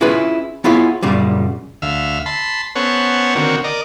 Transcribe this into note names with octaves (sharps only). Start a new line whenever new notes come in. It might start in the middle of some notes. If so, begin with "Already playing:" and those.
C#4 E4 F4 G#4 B4 D#5
B3 E4 F4 G#4 C#5
F#2 A#2 C#3 G3
D2 E5 F5
A5 B5 C6
B3 C#4 A4 C5 C#5 F#5
D3 D#3 A#3 C4 F#4 C#5
A#4 D5 D#5